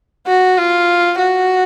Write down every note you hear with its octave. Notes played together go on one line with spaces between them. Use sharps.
F#4
F4
F#4